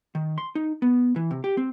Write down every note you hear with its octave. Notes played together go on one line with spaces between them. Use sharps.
D#3
C6
D#4
B3
E3
C3
G4
C4